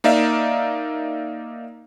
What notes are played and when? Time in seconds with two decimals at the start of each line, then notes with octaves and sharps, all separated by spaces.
0.04 A#3 D#4 D5 E5 F5